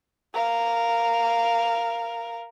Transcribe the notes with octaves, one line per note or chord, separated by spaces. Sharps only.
A#4 F5